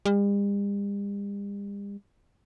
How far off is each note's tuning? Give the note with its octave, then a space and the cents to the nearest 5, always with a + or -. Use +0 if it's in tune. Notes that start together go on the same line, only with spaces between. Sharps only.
G3 +45